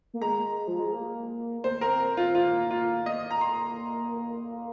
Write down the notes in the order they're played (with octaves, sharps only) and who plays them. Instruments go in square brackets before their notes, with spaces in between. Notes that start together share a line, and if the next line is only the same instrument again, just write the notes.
[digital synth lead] A#3
[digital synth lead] G#3 [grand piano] A#5
[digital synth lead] F3
G#3
A#3
[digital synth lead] A#3 [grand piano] C5
[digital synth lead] A#3 [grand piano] A#4
[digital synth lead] C4
C4
[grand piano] F4
[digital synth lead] A#3 [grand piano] F4
[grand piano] F4
[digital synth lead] A#3 [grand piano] D#5
[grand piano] A#5
C6